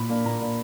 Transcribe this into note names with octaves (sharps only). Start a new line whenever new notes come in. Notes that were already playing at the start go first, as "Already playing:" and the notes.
Already playing: A#2 B5
A#3 D4
A#2 A#5
A#3 D4